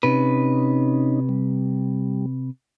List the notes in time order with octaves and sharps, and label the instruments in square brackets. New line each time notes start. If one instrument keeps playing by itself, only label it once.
[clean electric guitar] C3 B4 [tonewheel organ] C#4 D#4
[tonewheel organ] G3